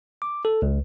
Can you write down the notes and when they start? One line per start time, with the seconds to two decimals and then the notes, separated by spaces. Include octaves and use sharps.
0.22 D6
0.45 A4
0.62 C#2